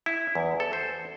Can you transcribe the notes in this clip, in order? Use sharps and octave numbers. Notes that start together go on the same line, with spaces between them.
E4
E2
A4
C5